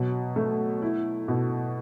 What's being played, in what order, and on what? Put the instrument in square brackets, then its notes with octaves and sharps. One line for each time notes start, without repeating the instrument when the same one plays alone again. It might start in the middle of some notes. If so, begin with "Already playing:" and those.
Already playing: [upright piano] B2 F#3
A3
E4
B2